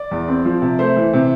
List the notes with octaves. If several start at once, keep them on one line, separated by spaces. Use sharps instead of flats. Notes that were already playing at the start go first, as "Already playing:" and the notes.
Already playing: D5
E2
C4
F3
C3
A3 C5
E3
C3